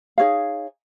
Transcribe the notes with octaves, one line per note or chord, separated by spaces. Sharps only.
D#4 G#4 C#5 F5